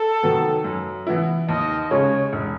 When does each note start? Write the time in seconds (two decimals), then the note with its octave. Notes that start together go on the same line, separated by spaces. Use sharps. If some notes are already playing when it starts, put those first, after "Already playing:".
Already playing: A4
0.23 D#3 F#3 B3
0.64 F#2
1.07 E3 B3 E4
1.49 D#2 D#5
1.90 C#3 G#3 C#4 C#5
2.33 E1